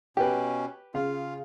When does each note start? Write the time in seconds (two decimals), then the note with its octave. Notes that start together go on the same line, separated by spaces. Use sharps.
0.17 B2 C#4 G4 B4
0.94 C#3 F4 F5